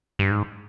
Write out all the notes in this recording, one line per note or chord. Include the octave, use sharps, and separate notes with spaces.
G2
G#2